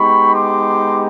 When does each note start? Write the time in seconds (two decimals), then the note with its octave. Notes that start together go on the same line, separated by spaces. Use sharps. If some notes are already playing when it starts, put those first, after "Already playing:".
Already playing: G#3 B3 D#4 G4 B5 C#6
0.33 C6 D6